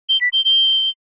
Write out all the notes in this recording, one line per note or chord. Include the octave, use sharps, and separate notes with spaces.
G7
B6
G7
G7